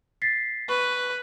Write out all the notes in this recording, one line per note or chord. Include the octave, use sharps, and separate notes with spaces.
A6 B6 C7
B4 C#6